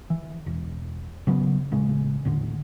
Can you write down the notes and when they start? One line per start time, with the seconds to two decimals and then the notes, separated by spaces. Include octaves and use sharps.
0.10 E3
0.46 E1
1.27 C#3 F#3 A3 B3
1.71 D#1 A1 C#3 G#3
2.25 D#2 A2 D3